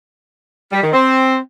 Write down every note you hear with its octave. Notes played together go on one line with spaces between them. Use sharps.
G3
D#3
C4